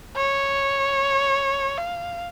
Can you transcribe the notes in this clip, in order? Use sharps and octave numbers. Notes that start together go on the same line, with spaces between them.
C#5
F5